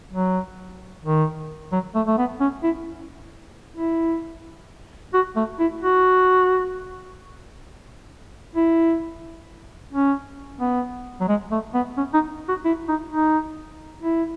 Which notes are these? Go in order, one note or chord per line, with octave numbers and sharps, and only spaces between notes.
F#3
D#3
F#3
A3
A3
B3
C#4
E4
E4
F#4
A3
E4
F#4
E4
C#4
B3
F#3
G#3
A3
B3
C#4
D#4
F#4
E4
D#4
D#4
E4